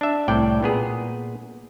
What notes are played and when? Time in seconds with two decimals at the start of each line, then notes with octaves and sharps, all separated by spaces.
0.01 D4 E5
0.28 C2 A2 D5 G5
0.63 A#2 B3 G#4